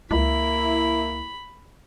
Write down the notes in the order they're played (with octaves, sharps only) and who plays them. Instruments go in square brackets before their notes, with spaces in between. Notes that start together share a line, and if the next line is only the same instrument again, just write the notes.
[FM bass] C#2 [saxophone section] A#3 E4 [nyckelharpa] B5